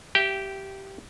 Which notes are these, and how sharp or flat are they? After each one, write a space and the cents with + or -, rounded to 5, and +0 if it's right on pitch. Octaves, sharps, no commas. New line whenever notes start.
G4 -10 E5 +25 G5 +0